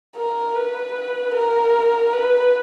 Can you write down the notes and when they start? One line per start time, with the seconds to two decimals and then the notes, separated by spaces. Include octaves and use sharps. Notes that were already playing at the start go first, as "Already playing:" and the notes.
0.16 A#4
0.55 B4
1.34 A#4
2.13 B4